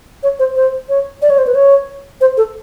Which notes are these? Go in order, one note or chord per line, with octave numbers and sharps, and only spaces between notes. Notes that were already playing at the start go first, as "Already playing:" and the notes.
C#5
C5
C5
C#5
D5
C#5
C5
B4
C#5
C5
A4